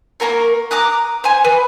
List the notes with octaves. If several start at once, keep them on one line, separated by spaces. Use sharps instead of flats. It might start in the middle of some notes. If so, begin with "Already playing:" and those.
A#3 E4 A#4 C#5
A#5 D6 D#6 F#6
C5 G#5
B4